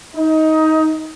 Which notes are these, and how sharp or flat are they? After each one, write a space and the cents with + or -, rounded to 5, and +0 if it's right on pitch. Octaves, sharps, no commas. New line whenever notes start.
D#4 +20